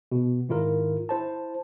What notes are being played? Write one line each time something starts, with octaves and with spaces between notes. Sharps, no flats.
B2
G#2 D#3 E4 F4 A#4
E4 C5 A5